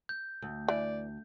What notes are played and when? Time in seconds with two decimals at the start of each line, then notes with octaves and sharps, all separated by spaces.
0.09 G6
0.42 D2
0.68 E3 D5